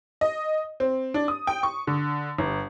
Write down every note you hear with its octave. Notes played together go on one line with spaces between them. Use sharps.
D#5
C4
D4
D#6
G5
C#6
D3
G1